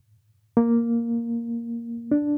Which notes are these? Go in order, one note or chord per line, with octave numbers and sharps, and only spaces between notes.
A#3
D4